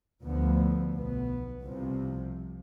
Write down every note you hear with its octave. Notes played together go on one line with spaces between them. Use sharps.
D2 D3 F3 B3
B1 B2 B3
C2 C3 F3